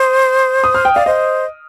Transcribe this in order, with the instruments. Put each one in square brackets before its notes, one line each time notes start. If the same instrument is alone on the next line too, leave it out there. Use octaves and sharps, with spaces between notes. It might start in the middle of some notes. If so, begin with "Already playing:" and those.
Already playing: [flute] C5 [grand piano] D#6
[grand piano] D#6
F6
G5
[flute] D5 [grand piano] F5
[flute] C5 [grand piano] D#5